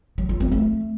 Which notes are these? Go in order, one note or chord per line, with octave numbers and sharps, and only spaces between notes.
F#3
F4
C4
A3